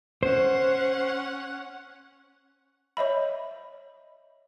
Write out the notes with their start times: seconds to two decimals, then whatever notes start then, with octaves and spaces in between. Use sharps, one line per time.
0.23 C#4 C5 F#5
2.97 C#5 D#5 E5 B5